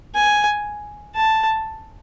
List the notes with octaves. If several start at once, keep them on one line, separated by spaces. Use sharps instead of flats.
G#5
A5